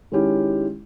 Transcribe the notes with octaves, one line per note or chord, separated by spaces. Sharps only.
D#3 G#3 C#4 E4 G4